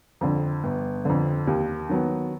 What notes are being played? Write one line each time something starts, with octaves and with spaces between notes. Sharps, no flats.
F2 D3
G1
F2 D3
D#2
D#3 F#3 B3